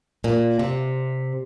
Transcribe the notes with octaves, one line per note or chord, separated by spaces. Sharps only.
A#2
C3